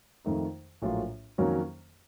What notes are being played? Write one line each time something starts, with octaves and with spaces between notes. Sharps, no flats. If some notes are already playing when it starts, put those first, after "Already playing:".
F2 D#3 A3 D#4
A#1 A2 F#3 A#3 F4
F2 D#3 F#3 A#3 C#4